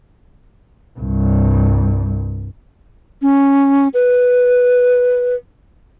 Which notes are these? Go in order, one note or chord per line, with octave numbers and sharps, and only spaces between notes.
C2 G2
C#4
B4